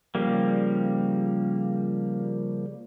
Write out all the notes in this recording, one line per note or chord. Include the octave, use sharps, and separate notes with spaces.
C#3 F3 G3 A#3